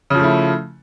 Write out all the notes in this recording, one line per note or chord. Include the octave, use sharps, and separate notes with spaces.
C#3 F3 A3 E4